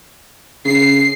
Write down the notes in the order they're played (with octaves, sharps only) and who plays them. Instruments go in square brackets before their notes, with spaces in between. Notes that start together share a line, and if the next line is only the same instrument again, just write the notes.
[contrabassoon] C#3 [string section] C7